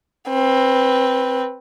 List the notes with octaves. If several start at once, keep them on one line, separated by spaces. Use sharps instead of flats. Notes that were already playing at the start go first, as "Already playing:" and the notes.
C4 B4